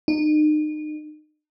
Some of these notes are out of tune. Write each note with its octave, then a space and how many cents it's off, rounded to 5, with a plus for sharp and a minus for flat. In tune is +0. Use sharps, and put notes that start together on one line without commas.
D#4 -35